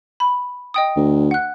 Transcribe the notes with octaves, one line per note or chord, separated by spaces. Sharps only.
B5
D#5 G5 D#6
D2
F#5 F#6